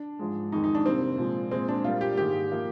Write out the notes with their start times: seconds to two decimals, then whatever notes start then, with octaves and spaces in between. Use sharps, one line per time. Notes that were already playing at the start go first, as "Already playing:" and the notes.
Already playing: D4
0.19 G#2 F3 G#3
0.52 F2 D#3 G#3 D#4
0.64 D#4
0.75 D4
0.85 C3 G3 A#3 C4
1.18 A#2 F3 G#3
1.51 A#2 G#3 C4
1.68 D4
1.84 A#2 G3 A#3 F4
2.01 G4
2.17 G#2 D#3 G#3 G4
2.51 F3 A#3